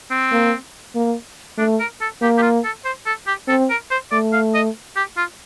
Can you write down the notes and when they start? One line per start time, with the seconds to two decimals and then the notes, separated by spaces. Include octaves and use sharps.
0.11 C4
0.32 A#3
0.95 A#3
1.58 A3 D4
1.80 A#4
2.01 A4
2.21 A#3 G4
2.38 G4
2.42 F4
2.64 A4
2.85 C5
3.06 A4
3.27 G4
3.48 C4 A4
3.70 A#4
3.91 C5
4.12 A3 D5
4.33 F5
4.55 D#5
4.97 G4
5.17 F4